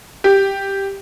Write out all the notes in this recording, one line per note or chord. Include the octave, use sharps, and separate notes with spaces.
G4